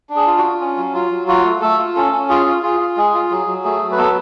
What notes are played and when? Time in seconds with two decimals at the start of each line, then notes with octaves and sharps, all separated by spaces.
0.09 D4
0.16 G#4
0.27 F4
0.38 F4 F#4
0.61 C#4
0.77 F#3
0.94 F4
1.11 F#3
1.28 F4 F#4
1.45 A3
1.61 A3 A4
1.79 F4
1.95 C#4 A4
2.13 C#4
2.29 F4 G#4
2.46 F4
2.63 F4 G#4
2.80 F4
2.97 G#3 G#4
3.14 F4
3.30 F#3 G#4
3.47 F#3
3.64 A3 G#4
3.82 F#3
3.92 B4
3.98 B3 A4